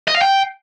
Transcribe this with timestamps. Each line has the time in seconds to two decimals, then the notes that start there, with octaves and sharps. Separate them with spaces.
0.08 D#5
0.15 F5
0.22 G5